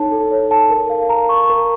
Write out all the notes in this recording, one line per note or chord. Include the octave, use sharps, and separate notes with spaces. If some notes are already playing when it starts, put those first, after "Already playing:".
Already playing: D#4 A4 C#5 A5
A4
C#5
A5
A#4
F5
A#5
C#6
A#4